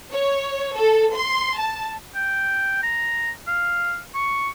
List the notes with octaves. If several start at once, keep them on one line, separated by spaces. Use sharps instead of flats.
C#5
A4
C6
A5
G5
A#5
F5
C#6